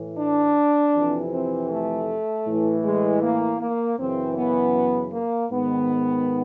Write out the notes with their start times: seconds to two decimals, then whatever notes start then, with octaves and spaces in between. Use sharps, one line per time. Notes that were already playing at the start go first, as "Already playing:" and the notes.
Already playing: A2 E3
0.18 D4
0.95 F2 C3 E3
1.33 C4
1.71 A3
2.46 A2 E3
2.84 G#3
3.22 A#3
3.61 A#3
3.98 F#2 C#3 E3 C4
4.37 B3
5.12 A#3
5.50 G#2 D#3 B3